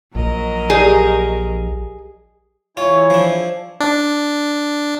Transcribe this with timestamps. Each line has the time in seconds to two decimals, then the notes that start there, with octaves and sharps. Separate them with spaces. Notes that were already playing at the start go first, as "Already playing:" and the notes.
0.15 A#1 F#3 A#4 D#5
0.70 G4 G#4 D5
2.77 E2 E4 F4 C#5 G#5
3.10 F3 D4
3.80 D4